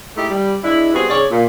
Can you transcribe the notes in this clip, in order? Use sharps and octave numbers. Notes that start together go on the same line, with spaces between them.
G#3 A3 D#4 E4 G4
G3
G#3 D4 E4
G3 B3 C4 F#4 G#4
G#2 C#3 C#5 D5
A#2